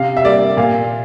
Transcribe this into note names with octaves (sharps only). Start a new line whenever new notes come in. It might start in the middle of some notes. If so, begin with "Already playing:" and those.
Already playing: C3 F5
E5
G3 A#3 D5
A#2 F5